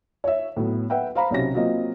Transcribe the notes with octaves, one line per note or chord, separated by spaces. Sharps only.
C#5 E5
A2 F#3 B3
B4 E5 F#5 G5
C5 F5 A#5 B5
B1 C3 C#4 F#4 G4 A#6
F#3 A#3 C4 F4 D#5